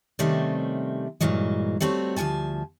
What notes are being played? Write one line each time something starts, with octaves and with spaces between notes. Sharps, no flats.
C3 D#3 G3 A3 C4 C#4
G2 A#2 E3 F#3 G#3
G3 A3 C4 F#4 C#5
D2 G2 F3 G#5 A5